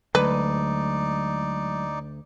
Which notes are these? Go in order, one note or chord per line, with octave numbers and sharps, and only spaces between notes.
D2 F#3 G#3 D#4 B4 D5